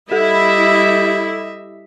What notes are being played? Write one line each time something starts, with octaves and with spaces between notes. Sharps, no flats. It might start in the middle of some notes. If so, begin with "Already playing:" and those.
G3 E4 G4 A4 D#5 E5